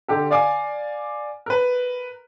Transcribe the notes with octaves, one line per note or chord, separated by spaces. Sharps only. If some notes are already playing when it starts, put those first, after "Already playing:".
D3 G4 A4
D5 F5 G#5 D6
A#4 B4